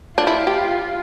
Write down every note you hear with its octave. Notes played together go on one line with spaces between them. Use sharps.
D4 F4
E4
G4